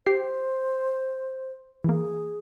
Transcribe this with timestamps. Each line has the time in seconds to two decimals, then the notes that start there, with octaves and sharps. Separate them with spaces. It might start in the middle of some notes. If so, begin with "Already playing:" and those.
0.06 G4 C5 C7
1.84 E3 A#3 G#4